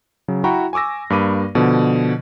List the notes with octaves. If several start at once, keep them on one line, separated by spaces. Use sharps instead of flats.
C#3 F#3
E4 F#4 G5 A#5 B5 C#6
G#5 C#6 D6 E6 A#6
G2 A#3 B5 D6 D#7
B2 D3 F3